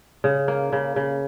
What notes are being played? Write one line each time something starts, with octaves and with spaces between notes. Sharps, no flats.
C#3
A#3
C#3
C#3